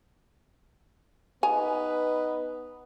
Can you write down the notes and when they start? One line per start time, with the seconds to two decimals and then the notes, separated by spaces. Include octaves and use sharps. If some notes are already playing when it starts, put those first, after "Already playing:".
1.43 B3 D#4 B4 G#5 A#5